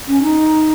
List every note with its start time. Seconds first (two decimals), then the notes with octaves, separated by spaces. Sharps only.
0.08 C#4
0.23 D#4